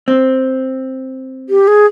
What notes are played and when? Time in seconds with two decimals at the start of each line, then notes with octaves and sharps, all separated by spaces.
0.08 C4
1.49 G4
1.68 G#4